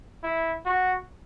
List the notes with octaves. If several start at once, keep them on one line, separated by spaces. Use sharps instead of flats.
E4
F#4